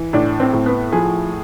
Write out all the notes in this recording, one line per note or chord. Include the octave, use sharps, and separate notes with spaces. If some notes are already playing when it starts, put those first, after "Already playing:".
Already playing: E3
A2 D4
C4
A2
B3
F3 G#4